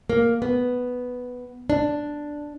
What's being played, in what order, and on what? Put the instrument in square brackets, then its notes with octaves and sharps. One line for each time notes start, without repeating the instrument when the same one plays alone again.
[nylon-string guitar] A#3
B3
D4